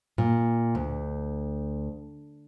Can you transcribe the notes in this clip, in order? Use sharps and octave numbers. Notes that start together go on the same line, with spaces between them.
A#2
D2